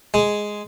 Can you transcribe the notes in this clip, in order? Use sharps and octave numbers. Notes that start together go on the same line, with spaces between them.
G#3